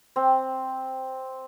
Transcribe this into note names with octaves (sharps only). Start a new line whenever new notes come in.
C4